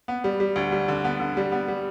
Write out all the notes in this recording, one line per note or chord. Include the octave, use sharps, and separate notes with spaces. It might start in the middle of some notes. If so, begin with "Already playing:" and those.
B3
G3
G3
D2
G3
D3
B3
D3
G3
B3
G3